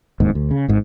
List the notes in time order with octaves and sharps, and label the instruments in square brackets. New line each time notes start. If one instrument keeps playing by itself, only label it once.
[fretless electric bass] D1 D#2 G#2
D2
C#3
G#1 G#2